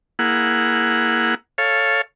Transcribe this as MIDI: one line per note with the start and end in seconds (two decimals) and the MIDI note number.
0.19 1.35 58
0.19 1.35 64
0.19 1.35 68
0.19 1.35 78
1.58 2.01 69
1.58 2.01 73
1.58 2.01 77